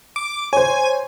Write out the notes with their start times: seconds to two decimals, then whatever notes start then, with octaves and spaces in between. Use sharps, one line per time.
0.16 D6
0.53 C5 C#5 G#5